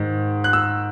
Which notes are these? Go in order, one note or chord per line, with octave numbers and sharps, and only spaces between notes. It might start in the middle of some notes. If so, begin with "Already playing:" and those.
Already playing: G#2 D#3
F#6
E6